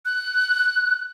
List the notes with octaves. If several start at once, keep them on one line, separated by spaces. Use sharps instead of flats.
F#6